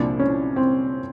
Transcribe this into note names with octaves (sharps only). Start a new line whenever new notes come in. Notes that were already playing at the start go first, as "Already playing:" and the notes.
Already playing: C2 A#2 F3 D4
C#4
C4